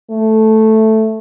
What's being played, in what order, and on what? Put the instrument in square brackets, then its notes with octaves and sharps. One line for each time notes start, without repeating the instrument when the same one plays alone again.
[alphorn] A3